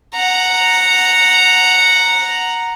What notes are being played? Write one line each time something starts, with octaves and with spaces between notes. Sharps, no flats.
F#5 A#5